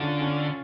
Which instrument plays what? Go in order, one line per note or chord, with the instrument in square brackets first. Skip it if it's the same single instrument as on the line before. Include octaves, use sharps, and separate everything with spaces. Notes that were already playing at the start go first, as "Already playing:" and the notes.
Already playing: [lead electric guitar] D3 [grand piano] C#4 F4
[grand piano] C#4